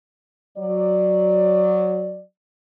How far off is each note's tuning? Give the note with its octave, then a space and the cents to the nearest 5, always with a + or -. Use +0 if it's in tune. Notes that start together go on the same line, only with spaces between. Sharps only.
F#3 +0 D5 +15